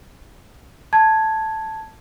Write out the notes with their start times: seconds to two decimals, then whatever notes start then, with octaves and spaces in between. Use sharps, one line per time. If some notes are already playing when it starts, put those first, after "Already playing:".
0.93 A5 G#6